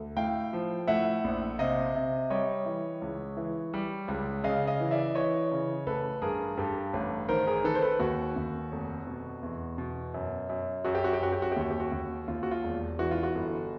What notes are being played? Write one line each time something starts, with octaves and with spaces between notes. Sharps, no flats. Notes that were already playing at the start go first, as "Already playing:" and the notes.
Already playing: D2
A2 F5 G5
F3
A2 E5 F#5
A#1
C3 D#5 F5
C3
G3 C#5 D#5
E3
C#2
E3
G3
C#2
C#3 D#5 F5
D#5 F5
E3
D5 E5
E3 C#5 D#5
C#3
A1 A4 B4
G2 G#4 A#4
G2 G4 A4
A1
D#3 A#4 C5
G#4 A#4
D#3 A4 B4
C5
A4 B4
D#2 F#4
D#2
F1
B2
E2
B2
F#2
F#2
F#2 F#4
G4
F#4
G4
F#2 F#4
G4
F#4
G4
D#2 F#4
G4
F#4
D#2
D#2 F4
F#4
F4
E1
E3 F#4
F4
F#4
G1